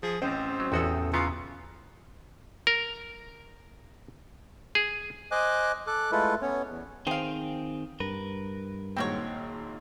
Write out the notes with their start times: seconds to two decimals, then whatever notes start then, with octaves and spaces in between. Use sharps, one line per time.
0.03 F3 G#4
0.22 A1 C4 C#4 C5 D#5 G5
0.60 F#3
0.72 A1 E2 F#4 A4 G5 D#6 E6
1.13 C#3 E3 B3 F4 A#5 C#7
2.67 A#4
4.75 G#4
5.32 C5 D#5 G#5 D6 F#6
5.87 A4 D6 F#6
6.12 G#3 A3 E4 F4 A4 B4
6.42 B3 C#4 C#5
6.69 E2
7.07 D#3 C4 G#4 C5 F5 G5
8.00 G2 A#4 B4
8.97 G#1 A#2 C4 F#4 C#5 G5